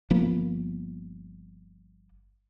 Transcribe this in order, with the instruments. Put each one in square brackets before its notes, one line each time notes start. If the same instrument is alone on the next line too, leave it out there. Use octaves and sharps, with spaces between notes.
[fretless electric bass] G1 F3 A#3 B3